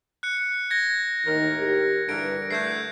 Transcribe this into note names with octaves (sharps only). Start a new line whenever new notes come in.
F#6 C#7
G#6 A#6
D#2 A2 D#3 A#4
G4
G2 D3 E3 A#4 D7
D3 A3 G6 G#6 C7